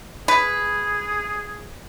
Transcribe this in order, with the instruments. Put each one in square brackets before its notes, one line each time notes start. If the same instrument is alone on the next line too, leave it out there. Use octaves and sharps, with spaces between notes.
[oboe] G#4 [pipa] B4